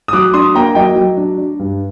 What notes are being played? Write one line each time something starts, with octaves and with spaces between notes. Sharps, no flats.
D#6
F#3 D6 F#6
D4 C6 D#6
A#3 G5 A#5
F#3 D#5 G5
F#3
D4
D4
G2